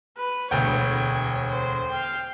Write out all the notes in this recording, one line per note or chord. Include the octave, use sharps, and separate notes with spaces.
B4
E1 D2 C#5 G5
C5
F5 G5